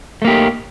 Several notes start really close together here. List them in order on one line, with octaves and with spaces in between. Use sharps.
A3 A#3 G4